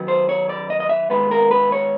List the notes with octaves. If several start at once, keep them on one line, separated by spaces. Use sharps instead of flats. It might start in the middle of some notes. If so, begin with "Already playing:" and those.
Already playing: D#3 F#3 B3
C5
C#5
D5
D#5
D#5
E5
D#3 G#3 B3 B4
A#4
B4
C#5